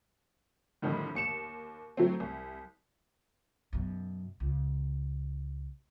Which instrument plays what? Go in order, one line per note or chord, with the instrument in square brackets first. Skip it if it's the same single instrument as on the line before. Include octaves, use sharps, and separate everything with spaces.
[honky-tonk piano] F2 A2 D3 D#3 G3
D#2 C#7 E7
F#3 A3 C4
C2
[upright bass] F#2 B2
C#2